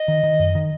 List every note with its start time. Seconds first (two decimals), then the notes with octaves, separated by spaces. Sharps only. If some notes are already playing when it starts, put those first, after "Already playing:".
Already playing: D#5
0.08 D#3
0.23 D#3
0.40 F#2
0.55 D#3